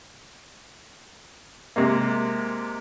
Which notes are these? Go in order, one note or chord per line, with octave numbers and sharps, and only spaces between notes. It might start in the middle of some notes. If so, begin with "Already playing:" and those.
C3 G#3 A#3